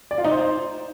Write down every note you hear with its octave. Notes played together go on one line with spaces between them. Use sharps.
D5
F4
D#4
C5